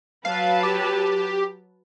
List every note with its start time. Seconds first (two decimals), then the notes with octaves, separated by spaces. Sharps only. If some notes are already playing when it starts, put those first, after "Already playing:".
0.25 F#3 B4 F5 A5
0.63 G4